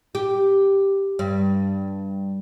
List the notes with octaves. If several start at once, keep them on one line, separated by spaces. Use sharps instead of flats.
G4
G2